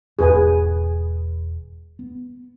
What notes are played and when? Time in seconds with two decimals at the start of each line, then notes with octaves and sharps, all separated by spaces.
0.19 E1 E2 G#2 G#4 B4 G#5
1.99 B3